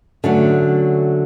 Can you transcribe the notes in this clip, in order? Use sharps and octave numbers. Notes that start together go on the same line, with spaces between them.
D3 F#3 A3 C#4